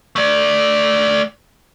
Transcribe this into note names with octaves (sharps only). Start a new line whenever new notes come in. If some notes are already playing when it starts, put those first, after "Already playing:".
A3 D5